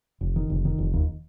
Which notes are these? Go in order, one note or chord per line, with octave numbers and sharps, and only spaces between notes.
F1
D#3
F1
D#3
F1
D#2